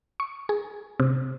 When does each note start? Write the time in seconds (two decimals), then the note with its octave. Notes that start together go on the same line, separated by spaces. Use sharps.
0.20 C#6
0.49 G#4
1.00 C3